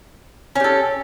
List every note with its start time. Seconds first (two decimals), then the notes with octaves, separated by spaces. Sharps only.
0.56 C#4
0.60 G4
0.64 A4